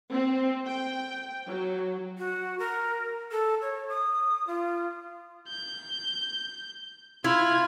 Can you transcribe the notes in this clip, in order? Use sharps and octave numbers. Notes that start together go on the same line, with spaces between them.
C4
G5
F#3
F#4
A#4
A4
C#5
D#6
F4
G6
E4 F4 F6 G#6